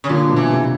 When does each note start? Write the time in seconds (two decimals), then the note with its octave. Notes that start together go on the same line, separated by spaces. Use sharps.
0.04 C#3
0.09 A#2 D3
0.29 B2
0.36 E3
0.50 C3